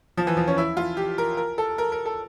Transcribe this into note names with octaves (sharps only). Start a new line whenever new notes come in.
F3
E3
F3
C#4
E4
F4
G4
A#4
A#4
A4
A#4
A#4
A4